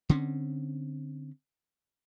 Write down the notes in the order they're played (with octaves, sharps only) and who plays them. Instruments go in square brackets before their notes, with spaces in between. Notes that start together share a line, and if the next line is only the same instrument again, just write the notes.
[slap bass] D3 C4 C#4